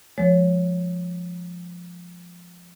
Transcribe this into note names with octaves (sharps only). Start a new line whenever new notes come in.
F3 G#3 C#5